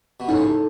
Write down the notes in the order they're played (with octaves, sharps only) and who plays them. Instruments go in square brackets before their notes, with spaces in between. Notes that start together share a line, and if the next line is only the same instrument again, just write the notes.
[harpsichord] B2
[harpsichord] A2 C#3 [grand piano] D#4
[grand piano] A4